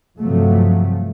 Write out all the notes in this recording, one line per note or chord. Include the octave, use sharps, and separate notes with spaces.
G2 C3 F3 F#3 A3